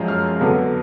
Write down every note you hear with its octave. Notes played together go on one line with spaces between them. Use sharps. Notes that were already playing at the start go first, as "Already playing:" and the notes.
Already playing: F#2 F3 G#3 C#4
F6
F2 D3 F#3 B3